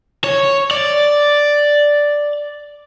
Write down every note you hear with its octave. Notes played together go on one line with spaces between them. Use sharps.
C#5
D5